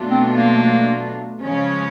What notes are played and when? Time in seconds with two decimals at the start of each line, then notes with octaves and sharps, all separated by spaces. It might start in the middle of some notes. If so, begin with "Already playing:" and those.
Already playing: B2 F#3 A3 D4 F4
0.10 C4
0.37 A#3
1.42 C#3 F3 G#3 C#4